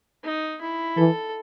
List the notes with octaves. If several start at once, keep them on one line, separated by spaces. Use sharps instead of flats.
D#4
E4
E3 A4